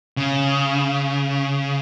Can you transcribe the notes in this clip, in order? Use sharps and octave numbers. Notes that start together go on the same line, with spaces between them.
C#3